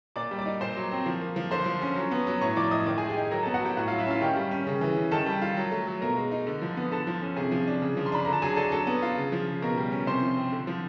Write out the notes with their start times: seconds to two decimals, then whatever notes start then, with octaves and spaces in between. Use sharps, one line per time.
0.16 A#2 D5 D6
0.31 G3
0.39 D5 D6
0.46 D#4
0.61 A#2 C5 C6
0.76 F#3
0.91 C4
1.06 F3
1.21 A#3
1.36 F3
1.51 D3 C5 C6
1.66 F3
1.81 C#4
1.96 F#3
2.11 B3
2.27 F#3
2.41 A2 C#5 C#6
2.56 F3 D5 D6
2.71 A2 D#5 D#6
2.86 D#3 D5 D6
2.98 G#4 G#5
3.01 G#3
3.09 G4 G5
3.16 D#4
3.31 F#3 A#4 A#5
3.43 A4 A5
3.46 B3
3.54 F#4 F#5
3.61 F#3 G4 G5
3.77 A2 F#4 F#5
3.88 F4 F5
3.91 F#3
3.98 E4 E5
4.07 C#4 F4 F5
4.21 D#3 G4 G5
4.36 G3
4.51 C#4
4.66 C#3
4.81 E3
4.96 C#3
5.11 D#3 A4 A5
5.26 G3
5.41 F4
5.57 F#3
5.72 A3
5.87 F#3
6.02 B2 A#4 A#5
6.17 G#3
6.31 D#4
6.47 D3
6.62 F3
6.77 B3
6.91 D3 A4 A5
7.07 F3
7.21 C#4
7.36 C3 G#4 G#5
7.52 F3
7.67 D4
7.82 C#3
7.97 F3
8.06 C6
8.12 D4 B5
8.25 D3 A#5
8.33 A5
8.42 F#3 G#4 G#5
8.56 D4 A4 A5
8.72 F#3 A4 A5
8.87 B3
9.02 F4
9.17 C#3
9.32 F3
9.47 C#3
9.62 B2 A#4 A#5
9.77 G3
9.92 C#4
10.07 C3 C5 C6
10.22 F3
10.37 C4
10.52 D3
10.67 F3